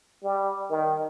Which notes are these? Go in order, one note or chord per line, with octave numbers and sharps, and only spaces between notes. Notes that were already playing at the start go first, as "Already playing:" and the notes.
G3
D#3